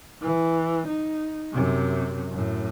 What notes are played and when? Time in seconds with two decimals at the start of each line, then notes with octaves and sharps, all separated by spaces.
0.22 E3
0.87 D#4
1.53 F#2 C3
2.31 F#2 A2